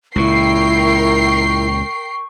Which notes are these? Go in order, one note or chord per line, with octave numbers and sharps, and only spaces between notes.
C#2 A#2 E4 A#4 G5 C#6 C7